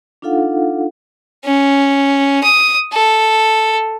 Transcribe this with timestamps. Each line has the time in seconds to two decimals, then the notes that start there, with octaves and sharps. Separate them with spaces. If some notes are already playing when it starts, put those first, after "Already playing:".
0.22 D4 D#4 F4 A4 F5 F#5
1.45 C#4
2.43 D#6
2.93 A4